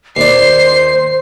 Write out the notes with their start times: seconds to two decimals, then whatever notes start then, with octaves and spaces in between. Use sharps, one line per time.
0.17 D#2 C5 D5 C7